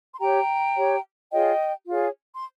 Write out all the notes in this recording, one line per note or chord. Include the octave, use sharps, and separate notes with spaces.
C6
G4 C#5 G5 A#5
G4 C#5
F4 G#4 C#5 D#5 G5
F4 G#4 C#5
C6